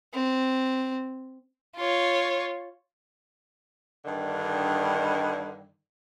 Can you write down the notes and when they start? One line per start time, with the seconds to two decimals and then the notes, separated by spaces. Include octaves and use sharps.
0.14 C4
1.77 F4 C#5
4.05 G2 D3 D#3